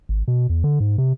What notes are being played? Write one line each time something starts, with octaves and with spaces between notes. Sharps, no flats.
G#1
B2
E2
D3
G#2
C3